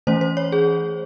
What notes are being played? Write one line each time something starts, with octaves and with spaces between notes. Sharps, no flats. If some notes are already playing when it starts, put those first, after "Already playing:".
E3 A3 C#4 C5
C5
C#5
G#4